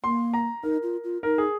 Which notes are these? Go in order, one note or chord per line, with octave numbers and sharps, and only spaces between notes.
A#3 C6
A#5
D#4 A#4
F4
F4
D#4 A#4
G#4